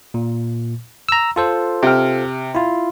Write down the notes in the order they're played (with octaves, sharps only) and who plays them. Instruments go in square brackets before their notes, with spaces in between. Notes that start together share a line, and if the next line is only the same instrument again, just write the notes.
[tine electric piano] A#2
A#5 E6
F4 A4 C5
[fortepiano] C3 G5 F6
[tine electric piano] E4 F4